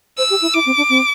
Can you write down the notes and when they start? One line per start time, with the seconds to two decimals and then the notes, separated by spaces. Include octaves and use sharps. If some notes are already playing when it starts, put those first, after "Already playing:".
0.18 C5 E6
0.30 G4
0.42 E4
0.54 E4 D6
0.66 C4
0.77 D4
0.89 C4